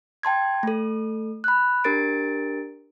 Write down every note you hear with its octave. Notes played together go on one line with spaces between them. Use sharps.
G5 A5 C6 G#6
A3 A4
B5 F#6
D4 G4 A#4 A6 D7